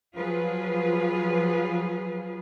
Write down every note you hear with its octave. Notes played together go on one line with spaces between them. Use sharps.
F3 F#3 F4 G#4 B4